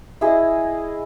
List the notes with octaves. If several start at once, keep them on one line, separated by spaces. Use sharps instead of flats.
E4 G#4 D#5